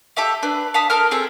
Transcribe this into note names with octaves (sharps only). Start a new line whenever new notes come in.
G4 A4 E5 F5
D4 B4
F5 A5 B5 D#6
A4 A#4 F6
C4 G#4 A4